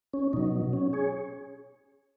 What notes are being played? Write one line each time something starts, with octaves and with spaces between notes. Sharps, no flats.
C#4
B2 F#3 D#4
C#4
G#4 C#5